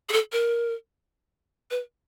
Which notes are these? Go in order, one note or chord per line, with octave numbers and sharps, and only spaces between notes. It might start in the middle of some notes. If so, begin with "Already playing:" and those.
G#4
A4
A#4
B4